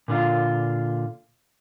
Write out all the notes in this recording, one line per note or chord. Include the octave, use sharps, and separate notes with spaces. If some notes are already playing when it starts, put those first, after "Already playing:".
A#2 D3 F4 F5